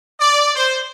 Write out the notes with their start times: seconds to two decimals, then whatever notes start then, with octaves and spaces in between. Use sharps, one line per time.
0.20 D5
0.56 C5